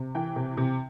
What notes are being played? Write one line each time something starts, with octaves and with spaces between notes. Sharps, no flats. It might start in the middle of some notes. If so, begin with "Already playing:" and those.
Already playing: C3
E3 G5
C3
C3